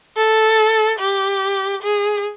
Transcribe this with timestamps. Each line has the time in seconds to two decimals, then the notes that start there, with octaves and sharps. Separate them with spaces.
0.17 A4
0.99 G4
1.83 G#4